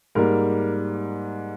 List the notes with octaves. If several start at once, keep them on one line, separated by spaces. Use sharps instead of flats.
G#2 G3 A#3 A#4